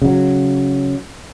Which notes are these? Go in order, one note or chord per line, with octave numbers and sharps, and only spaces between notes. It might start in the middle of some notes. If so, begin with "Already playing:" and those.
C#3 F#3